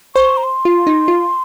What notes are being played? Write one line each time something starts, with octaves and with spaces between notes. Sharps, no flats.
C5 C#6
A#5
C6
F4
D#4
F4